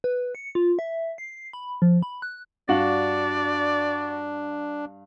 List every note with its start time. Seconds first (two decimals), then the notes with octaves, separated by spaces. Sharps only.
0.04 B4
0.35 C#7
0.55 F4
0.79 E5
1.18 C7
1.53 B5
1.82 F3
2.03 B5
2.22 F#6
2.69 G2 D4 F#4 D5 F5 F#7